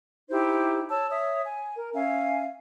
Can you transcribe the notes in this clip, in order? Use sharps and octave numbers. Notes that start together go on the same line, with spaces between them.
D#4 E4 G4 C5
C#5 A5 E6
C#5 E5 D#6
G#5
A#4
C#4 E5 F5 G#5